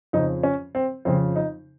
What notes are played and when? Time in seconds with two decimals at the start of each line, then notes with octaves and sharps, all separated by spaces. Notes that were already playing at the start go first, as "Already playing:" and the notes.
0.13 F2 C#3 F3 D#4
0.43 C#4
0.75 C4
1.05 F2 C#3 F3 C4
1.36 D#4